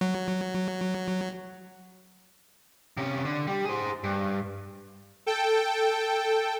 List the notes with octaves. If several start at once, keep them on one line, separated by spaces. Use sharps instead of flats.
F#3
C3 C#4
D3
G3
G#4 C5
G2
A4 G5